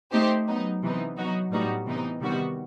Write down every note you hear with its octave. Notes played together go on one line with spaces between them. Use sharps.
A3 C4 D#4 G4 C5
F#3 B3 D#4
C3 E3 B3 D#4
F#3 B3 D#4 F#4
A2 G3 B3 D#4 F#4
C3 E3 B3 D#4
C3 D#3 G3 B3 F#4